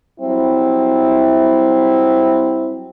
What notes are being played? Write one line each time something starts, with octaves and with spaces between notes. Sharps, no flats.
F#3 G3 C4 E4